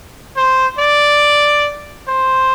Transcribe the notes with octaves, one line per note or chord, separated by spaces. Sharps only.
C5
D5
C5